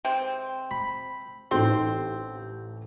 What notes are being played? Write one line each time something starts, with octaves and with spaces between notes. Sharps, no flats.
C3 G#3 C4
B5
A1 C4 D#4 A4 C6